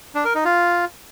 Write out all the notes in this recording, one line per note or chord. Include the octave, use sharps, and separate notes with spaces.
D4
A#4
D#4
F4